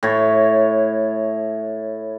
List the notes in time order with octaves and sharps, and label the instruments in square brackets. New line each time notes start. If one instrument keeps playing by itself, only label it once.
[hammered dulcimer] A2 C#5